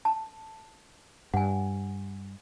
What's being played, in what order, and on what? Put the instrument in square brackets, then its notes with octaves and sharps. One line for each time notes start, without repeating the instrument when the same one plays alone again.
[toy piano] A5
[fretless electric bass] G2 [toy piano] F#5 G#5